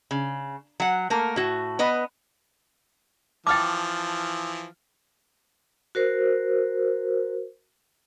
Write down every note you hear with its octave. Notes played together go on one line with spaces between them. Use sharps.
C#3
F#3 F#5
A3 A#3 A#4
A2 F#4
B3 B4 D#5
E3 F3 G5 A5 D6 F6 A6
F#4 A#4 C5